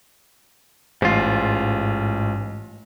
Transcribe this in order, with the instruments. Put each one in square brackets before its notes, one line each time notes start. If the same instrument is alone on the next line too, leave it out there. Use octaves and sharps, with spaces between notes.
[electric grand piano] A1 [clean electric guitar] G#2 F4